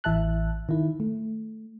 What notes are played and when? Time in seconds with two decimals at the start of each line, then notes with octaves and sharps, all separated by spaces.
0.04 A1 E3 E5 A5 F#6
0.69 D#3 E4
1.00 A3